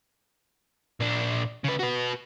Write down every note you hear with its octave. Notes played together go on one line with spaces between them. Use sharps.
A#2 D4
C#3 B4
F#4 B4